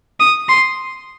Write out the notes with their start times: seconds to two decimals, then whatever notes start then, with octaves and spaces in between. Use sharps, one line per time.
0.20 D#6
0.49 C6